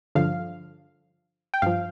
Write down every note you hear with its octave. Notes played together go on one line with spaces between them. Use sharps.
G2 D3 F3 F5
G5
G2 F3 F5